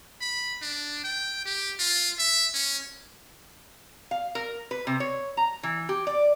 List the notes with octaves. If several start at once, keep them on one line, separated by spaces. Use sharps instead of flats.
B5
D4
G5
G4
F4
E5
C#4
F5
A#4
B4
C3
C#5
A#5
E3
G4
D5